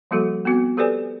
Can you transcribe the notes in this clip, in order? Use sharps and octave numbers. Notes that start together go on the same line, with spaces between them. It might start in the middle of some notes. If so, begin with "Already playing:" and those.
F3 G3 A#3 F#4 A4
B3 C4 F#4
G4 A4 B4 C5 D5 G#5